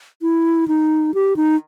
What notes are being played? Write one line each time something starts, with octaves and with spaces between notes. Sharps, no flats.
E4
D#4
G4
D#4